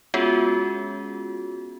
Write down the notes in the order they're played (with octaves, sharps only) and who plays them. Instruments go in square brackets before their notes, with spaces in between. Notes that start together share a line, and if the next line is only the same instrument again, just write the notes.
[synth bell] G#3 B3 C#4 F4 F#4 G#4